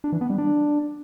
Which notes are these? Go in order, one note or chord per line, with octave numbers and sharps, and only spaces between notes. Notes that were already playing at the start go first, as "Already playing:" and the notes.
D4
E3
B3
G3
D4